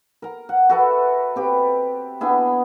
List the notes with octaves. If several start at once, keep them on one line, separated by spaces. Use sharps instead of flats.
A#4 A#5
F#5
F#4 A4 B4 E5
C4 G4 B4
B3 D4 E4 G#4